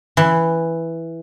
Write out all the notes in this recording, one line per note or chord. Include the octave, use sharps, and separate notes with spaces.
E3